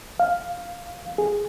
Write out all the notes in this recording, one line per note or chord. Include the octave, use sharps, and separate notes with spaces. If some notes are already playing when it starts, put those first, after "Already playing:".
F5
G#4